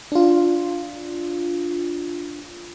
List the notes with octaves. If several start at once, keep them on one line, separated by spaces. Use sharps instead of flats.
D4 F4